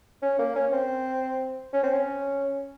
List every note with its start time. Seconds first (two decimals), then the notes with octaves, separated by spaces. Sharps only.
0.22 C#4
0.39 A#3
0.55 C#4
0.72 C4
1.73 C#4
1.83 C4
1.94 C#4